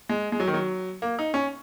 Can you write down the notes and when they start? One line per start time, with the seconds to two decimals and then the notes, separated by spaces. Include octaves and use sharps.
0.09 G#3
0.32 G#3
0.40 F#3
0.47 D#3
0.54 F#3
1.02 A#3
1.19 D#4
1.34 C#4